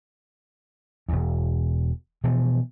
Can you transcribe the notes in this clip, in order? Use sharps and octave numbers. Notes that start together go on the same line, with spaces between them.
E1 E2
B2 E3 F3